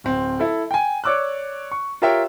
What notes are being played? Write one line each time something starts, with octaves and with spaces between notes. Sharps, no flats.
D1 C4
E4 A4
G5 G#5
C#5 D5 D6 E6 F#6
C#6
F4 G4 A#4 C#5 E5 G5